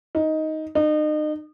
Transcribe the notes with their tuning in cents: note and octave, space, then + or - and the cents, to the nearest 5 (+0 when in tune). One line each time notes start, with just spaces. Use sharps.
D#4 +10
D#4 -35